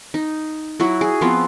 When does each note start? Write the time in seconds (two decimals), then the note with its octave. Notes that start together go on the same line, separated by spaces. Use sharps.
0.14 D#4
0.80 F#3 E4 F#4
1.01 G#4
1.21 F3 B3 C4 F4